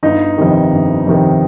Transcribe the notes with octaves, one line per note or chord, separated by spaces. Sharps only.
G1 D#4
F2 C3 D#3
G1
F2 C3 D#3